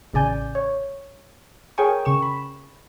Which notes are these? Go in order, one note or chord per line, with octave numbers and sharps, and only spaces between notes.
A1 C#3 D5 G#5 G6
C#5
G#4 A#4 C#5 G5 G#5 C#6
C#3 C#6 E7
B5